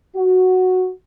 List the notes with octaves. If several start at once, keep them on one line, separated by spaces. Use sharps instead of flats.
F#4